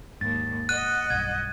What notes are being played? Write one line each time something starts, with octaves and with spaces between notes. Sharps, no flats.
D#2 G#2 A6
D#5 F#5 F#6 D#7
B1 G2 G#6